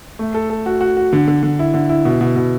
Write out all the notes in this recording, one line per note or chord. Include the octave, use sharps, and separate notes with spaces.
A3
A4
A4
F#4
F#4
F#4
D3
D3
D3
E4
D3
E4
B2
B2
B2